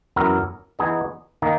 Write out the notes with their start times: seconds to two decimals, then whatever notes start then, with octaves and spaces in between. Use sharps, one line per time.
0.16 F#2 E3 B3 E4 A#4
0.79 E3 B3 D#4 G#4 D#5
1.42 D#3 A#3 D#4